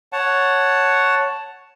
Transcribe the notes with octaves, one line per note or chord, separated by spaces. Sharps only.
C#5 F#5 A5